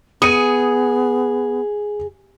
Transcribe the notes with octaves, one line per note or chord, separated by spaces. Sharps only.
B3 G#4 D#6 C#7 D#7